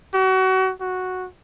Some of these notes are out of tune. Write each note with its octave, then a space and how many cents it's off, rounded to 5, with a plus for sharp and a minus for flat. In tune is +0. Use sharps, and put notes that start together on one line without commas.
F#4 +30
F#4 -5